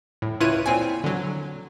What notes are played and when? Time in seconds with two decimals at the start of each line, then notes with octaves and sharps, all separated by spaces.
0.22 A2
0.40 C#2 E4 F4 B4 C#5 D#7
0.66 A#2 C4 G#5
1.04 D3 F#3